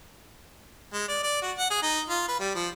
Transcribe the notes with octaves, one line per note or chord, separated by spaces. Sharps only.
G#3
D5
D5
F#4
F#5
G#4
D#4
F4
B4
G3
F3